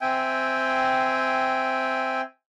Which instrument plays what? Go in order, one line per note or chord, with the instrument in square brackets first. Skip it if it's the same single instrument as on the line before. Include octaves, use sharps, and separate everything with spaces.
[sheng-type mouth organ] C4 E5 G5 G#5